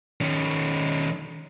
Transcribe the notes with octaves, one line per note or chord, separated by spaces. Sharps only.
D#3 C#4